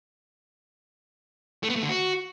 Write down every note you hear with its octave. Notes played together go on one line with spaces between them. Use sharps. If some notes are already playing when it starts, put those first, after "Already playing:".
A3
B3
A3
D3
F#4